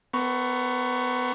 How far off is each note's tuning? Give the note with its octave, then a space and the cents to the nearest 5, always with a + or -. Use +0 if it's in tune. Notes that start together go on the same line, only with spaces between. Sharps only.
B3 +25 A#4 +0 C#6 +0